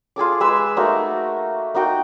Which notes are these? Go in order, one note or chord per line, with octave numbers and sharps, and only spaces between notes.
F4 G#4 A4 D6
G#3 B4 G#5 E6
A3 A#3 D#4 F#4
A#3 D#4 F#4 G5